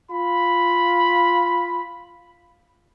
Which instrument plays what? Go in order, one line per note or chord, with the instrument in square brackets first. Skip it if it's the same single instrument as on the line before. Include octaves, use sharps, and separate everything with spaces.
[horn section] F4 B5